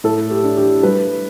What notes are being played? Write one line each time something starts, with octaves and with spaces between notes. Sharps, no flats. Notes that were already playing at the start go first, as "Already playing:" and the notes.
A2 A4
G4
D4
G4
G3 B4